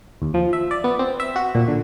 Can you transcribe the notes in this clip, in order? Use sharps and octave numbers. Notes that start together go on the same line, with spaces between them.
D#2
F3
E5
D5
B3
C4
E5
F#4
A#2
D3